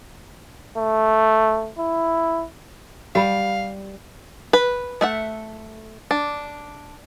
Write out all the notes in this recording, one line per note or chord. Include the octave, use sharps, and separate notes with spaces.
A3
E4
G3 G4 F5 B5
B4
A3 E5 F#5
D4